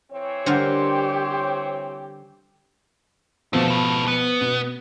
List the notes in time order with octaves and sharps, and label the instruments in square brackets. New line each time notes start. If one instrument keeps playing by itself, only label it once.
[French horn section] E3 C4 C#5
[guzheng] D3 G3 A#4 [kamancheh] G4 [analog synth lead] C5
[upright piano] B2 F3 [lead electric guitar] D3 A3
[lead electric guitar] A4 B4
B3
[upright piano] B2